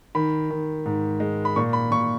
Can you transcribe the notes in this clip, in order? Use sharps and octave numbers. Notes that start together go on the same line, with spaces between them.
D#3 B5
D#3
G#2
G#3
B5
A#2 C#6
B5
A#2 C#6